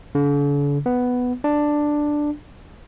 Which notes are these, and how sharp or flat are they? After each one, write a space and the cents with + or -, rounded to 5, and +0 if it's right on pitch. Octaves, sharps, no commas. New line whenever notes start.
D3 -45
B3 +5
D4 +5